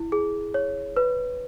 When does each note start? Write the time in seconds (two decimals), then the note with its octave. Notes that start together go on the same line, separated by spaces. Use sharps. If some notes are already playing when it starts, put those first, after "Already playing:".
Already playing: E4
0.12 G#4
0.54 C#5
0.96 B4